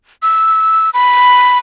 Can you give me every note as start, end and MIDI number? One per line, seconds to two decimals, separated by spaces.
0.22 0.90 88
0.94 1.58 83